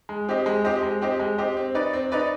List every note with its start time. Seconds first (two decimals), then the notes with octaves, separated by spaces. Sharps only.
0.09 G#3
0.29 C4 G4 C5 D#5
0.46 G#3
0.65 C4 G4 C5 D#5
0.83 G#3
1.02 C4 G4 C5 D#5
1.19 G#3
1.38 C4 G4 C5 D#5
1.57 C4
1.75 D#4 B4 D5
1.93 C4
2.12 D#4 B4 D5